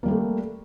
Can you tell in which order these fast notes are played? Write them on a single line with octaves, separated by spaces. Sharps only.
A#3 G3 G4 A3